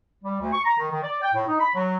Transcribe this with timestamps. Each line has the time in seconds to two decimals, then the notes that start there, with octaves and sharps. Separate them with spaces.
0.24 G3
0.40 D2
0.53 C#6
0.65 A#5
0.78 D#3
0.91 D#3
1.02 D5
1.22 G5
1.34 A2
1.47 D#4
1.60 B5
1.75 F#3